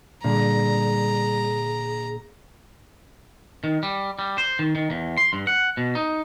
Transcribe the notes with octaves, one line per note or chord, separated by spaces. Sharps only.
A#2 D3 G3 G#4 A#5
D#3
G3
G3
C5
D#3
D#3
E2
C6
G2
F#5
B2
D#4